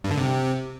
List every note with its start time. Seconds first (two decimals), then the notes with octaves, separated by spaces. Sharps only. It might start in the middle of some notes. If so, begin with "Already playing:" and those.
0.04 G2
0.11 D3
0.17 C3